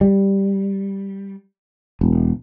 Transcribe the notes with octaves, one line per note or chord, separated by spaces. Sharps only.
G3
E1